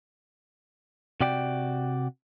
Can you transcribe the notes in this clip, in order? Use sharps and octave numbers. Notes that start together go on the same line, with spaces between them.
C3 F#4 D5 G5